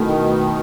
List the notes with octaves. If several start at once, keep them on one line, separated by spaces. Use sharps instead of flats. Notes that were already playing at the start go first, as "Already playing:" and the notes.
Already playing: B2 D#3 A3 E4 A4